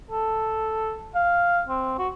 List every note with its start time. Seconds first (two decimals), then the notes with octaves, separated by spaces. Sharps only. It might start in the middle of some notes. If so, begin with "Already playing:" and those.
0.11 A4
1.15 F5
1.69 C4
1.99 F#4